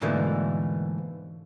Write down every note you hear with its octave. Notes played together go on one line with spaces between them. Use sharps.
G#2 B2 D3 E3 A3 A#3